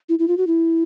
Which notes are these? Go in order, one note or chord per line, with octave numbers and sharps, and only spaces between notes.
E4
E4
F4
F#4
E4